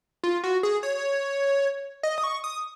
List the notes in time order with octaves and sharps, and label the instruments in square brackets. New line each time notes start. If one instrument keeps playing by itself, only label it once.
[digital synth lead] F4
F#4
G#4
C#5
D#5
D#6
C#6
D#6